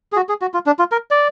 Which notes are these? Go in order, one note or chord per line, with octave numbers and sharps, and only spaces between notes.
G#4
F#4
G#4
F#4
F4
D4
F4
A#4
D5